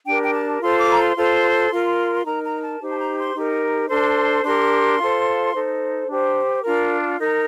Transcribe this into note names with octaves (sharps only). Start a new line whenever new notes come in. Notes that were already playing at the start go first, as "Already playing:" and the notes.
D4 G4 A#4 G5
G5
A5
F4 A4 C5 C6
D6
A#5
C6
F4 A4 C5
F4 A#4
C6
D#4 A#4 A#5
A#5
A5
D#4 G4 C5
A5
A#5
C6
D#4 G4 A#4
D4 A4 C5 C6
D4 G4 A#4 C6
F4 A4 C5
D#4 A4 C5
D4 G4 C5
D4 F4 A#4
D#4 A#4